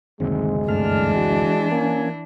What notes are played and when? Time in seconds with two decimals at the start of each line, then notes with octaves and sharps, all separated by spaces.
0.20 F#1 D2 C3 D#3 G#3 C4
0.68 G2 E3 A3 D4 F6
1.16 F#4
1.71 A#3 C#4 G#5